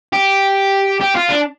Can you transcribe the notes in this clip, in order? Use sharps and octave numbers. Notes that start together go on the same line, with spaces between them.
G4
G4
F4
D4